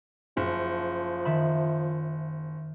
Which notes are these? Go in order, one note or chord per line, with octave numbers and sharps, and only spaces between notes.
F#1 F3
D#3 E5 B5